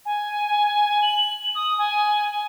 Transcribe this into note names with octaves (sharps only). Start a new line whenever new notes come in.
G#5
F#7
D#6
G#5